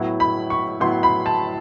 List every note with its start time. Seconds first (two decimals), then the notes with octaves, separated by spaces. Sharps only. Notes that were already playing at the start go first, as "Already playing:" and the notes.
Already playing: A2 F#3 B3 E4
0.20 B5
0.50 C#6
0.80 A2 F#3 B3 E4 C6
1.03 B5
1.26 A5